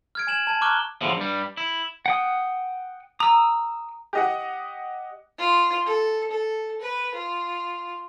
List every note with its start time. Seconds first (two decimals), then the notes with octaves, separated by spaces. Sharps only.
0.15 F6 G#6 D7
0.27 G#5 G#6 E7 F#7
0.47 A5 G#6
0.61 A#5 C#6 D6 F6 F#6 G7
1.01 E2 A2 D3 F3
1.17 G2 G3
1.57 E4
2.06 F#5 G5 D#6
3.20 A#5 D#6 E6
4.13 G4 D#5 F#5
5.38 F4
5.85 A4
6.30 A4
6.81 B4
7.14 F4